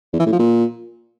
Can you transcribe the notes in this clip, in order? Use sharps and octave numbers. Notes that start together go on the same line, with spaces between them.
E2
E3
A2
F3
A#2